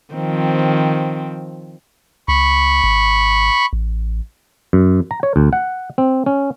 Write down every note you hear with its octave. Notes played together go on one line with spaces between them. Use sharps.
D#3 F3 C4
C#2 B5 C#6
G#1
A1
F#2
A#5
C#5
D2
F#5
C4
C#4